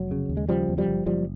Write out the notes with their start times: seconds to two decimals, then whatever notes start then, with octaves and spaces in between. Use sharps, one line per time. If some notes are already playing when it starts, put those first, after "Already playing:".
Already playing: F1 F#3
0.11 C#3
0.29 D#2
0.37 G#3
0.49 C#3 F3 G3
0.69 E2
0.78 F3 G3
0.88 F#1
1.06 F#1 F3 G3